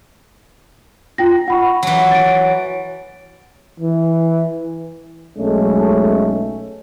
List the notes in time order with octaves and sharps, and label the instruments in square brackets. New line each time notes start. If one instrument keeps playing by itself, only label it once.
[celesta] F4 G5 A#6
F#5 B5 C#6
[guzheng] E3 F#3
[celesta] A6 D7
[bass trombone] E3
[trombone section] B1 G#3 A3 C#4 A4